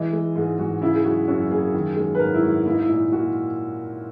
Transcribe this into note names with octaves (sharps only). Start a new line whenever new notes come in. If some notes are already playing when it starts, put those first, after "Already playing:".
Already playing: E3 G#3 D#5
G#3
G#2 G#4
G#2 F#4
C#3 E4
G#4
F#3 F#4
F#2 F#4
A#3 G#4
D#3
G#3
B4
G#2 A#4
E4
G#2 F#4
A#3 E4
D#4
E4
A#2
A#2 F#4